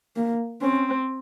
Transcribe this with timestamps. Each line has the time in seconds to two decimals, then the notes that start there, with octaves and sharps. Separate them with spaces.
0.16 A#3
0.61 C4 C#4